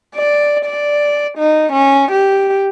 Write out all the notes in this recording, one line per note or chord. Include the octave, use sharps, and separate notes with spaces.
D5
D5
D#4
C#4
G4